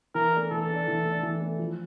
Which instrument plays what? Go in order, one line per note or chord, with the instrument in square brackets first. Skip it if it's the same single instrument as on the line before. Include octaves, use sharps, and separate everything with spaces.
[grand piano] E3 [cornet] A#4
[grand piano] A3 D4
[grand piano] E3 [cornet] A4
[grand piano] A3 D4
E3
A3 D4
E3
A3 D4
F3